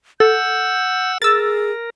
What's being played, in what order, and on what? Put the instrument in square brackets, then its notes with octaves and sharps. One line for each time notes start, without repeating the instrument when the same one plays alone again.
[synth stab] A4 [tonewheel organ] F#5 E6 [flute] G6
[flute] G#4 [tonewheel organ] A#4 [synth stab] E6 A6